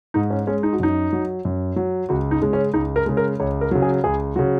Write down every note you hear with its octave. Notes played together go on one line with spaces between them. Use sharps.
G#2 D#4
C#4
G#3 C#4
D#4
F#4
F#2 D#4
F#3
F#2
F#3
C#2 F#4
D#4
C#3 G#3
C#4
C#2 D#4
A#4
C#3 G#3
A#4
C#2 C#5
A#4
C#3 F#3
G#4
C#2 G#4
C#3 F#3 F#4